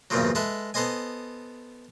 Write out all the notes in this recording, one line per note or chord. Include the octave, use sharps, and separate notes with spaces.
E2 G2 A#2 C#3 F3 F#3
G#3 A4 B4 E5
B3 A4 C5 D#5 G#5